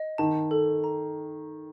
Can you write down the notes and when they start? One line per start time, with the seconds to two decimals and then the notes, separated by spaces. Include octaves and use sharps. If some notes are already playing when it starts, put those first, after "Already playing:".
Already playing: D#5
0.18 D#3 A5
0.51 A4
0.84 A#5